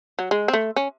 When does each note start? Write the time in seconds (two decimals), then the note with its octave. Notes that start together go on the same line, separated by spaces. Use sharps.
0.19 F#3
0.31 G#3
0.48 C4
0.53 A3
0.76 C#4